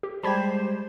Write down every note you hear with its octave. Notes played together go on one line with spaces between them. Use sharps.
G4
G3 G#3 G4 C5 A5 B5 G#6